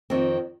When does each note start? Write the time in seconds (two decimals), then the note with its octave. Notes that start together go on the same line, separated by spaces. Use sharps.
0.10 F2 D#3 C4